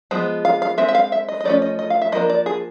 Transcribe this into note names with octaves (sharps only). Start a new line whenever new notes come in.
F3 G#3 B3
F5
F5
G#3 C4 E5
E5
F5
E5
D#5
D#5
F3 A3 C#4 D5
D#5
D#5
F5
E5
F3 A#3 D4 D#5
D5
G#4